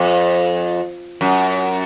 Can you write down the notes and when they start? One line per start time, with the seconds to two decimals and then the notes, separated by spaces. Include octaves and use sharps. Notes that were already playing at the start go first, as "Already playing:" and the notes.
Already playing: F2
1.21 F#2